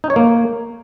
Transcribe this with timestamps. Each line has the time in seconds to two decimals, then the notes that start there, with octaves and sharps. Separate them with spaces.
0.04 D#4
0.10 C#5
0.16 A#3